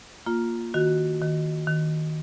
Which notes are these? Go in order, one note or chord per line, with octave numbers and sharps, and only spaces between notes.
A#3 F4
D#3 F#4
D#3
D#3